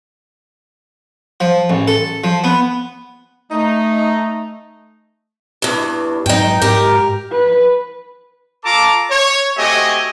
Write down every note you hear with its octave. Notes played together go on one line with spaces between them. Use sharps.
F3
A1
A4
F3
B3
A3 D#4
E2 G2
G#2 F#3 D#4 G5
G#2 G4 A#4
B4
F4 A4 A5 A#5 D6
C#5
A3 C4 F#4 G4 D#5 G#5